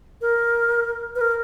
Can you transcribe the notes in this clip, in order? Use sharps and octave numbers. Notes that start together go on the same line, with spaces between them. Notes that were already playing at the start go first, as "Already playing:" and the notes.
A#4
B4
A#4